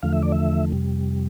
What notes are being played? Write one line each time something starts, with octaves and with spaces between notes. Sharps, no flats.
E2 D3 F3 A3 F5
E5
D5
E5
F2 C3 G3